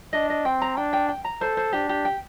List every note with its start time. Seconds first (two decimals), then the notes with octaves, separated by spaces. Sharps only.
0.13 D4 D#5
0.30 D#5
0.45 C4 G5
0.62 A#5
0.77 D4 G5
0.93 G5
1.09 G5
1.24 A#5
1.41 A4 C5
1.57 C5
1.73 D4 G4
1.89 G4
2.05 G5